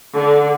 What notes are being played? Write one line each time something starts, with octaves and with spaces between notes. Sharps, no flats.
D3